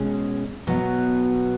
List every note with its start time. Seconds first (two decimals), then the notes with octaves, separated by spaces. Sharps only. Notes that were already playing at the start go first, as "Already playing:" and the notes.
Already playing: B2 G#3 C#4 G#4
0.67 B2 F#3 B3 F#4